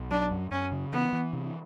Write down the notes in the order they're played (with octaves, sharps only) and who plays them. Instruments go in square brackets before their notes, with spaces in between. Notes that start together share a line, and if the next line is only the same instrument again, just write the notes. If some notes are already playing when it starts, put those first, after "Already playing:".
Already playing: [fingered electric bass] B1
[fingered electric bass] F#3 [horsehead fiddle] D4
[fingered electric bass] F#2
[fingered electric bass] F#2 [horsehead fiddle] C#4
[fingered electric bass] C#3
[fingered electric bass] E3 [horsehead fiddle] B3
[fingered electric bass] E3
C3